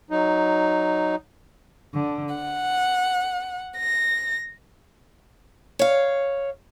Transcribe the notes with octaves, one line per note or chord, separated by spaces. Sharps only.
F#3 D#4
D3
F#5
A#6
C#5 F5